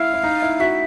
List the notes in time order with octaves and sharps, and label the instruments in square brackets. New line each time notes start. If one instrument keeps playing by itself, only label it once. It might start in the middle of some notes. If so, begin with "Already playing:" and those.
Already playing: [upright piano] E4 [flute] F5
[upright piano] E4
D#4
E4
[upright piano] F#4 [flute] E5